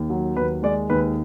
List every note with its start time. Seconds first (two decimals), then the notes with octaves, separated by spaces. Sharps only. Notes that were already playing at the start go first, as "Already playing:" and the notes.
Already playing: D#2
0.10 F#3
0.36 D#2 B4
0.63 G#3 D5
0.90 D#2 B4